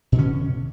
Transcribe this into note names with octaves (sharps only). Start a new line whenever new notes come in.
B2 D3 C#4